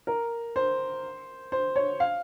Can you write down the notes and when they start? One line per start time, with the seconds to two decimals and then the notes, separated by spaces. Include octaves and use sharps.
0.07 A#4
0.56 C5
1.52 C5
1.76 C#5
2.00 F5